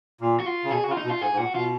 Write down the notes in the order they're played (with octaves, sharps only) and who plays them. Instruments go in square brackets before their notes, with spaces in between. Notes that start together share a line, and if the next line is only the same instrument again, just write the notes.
[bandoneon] A#2
[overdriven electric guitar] F#4
F4
[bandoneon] C#3
[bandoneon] B2 [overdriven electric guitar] G#4
[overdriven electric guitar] F#4
[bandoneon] C#3
[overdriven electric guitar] F4
D#4
[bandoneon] B2
[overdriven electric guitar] F4
[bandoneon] G#2 [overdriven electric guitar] G#4
[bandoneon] G#2
[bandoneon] A#2 [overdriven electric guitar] F#4
[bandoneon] B2 [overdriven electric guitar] F4